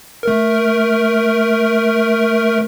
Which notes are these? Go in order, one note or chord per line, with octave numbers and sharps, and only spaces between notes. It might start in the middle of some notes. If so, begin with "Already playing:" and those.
A3 A#4